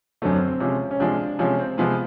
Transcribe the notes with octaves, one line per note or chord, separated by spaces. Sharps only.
F#2 D3 F#3 A3 C4
C4
C4
C3 F3 G#3 C#4
C#4
C3 F3 G#3 D4
C3 F3 G#3 C#4
C4
C3 F3 G#3 B3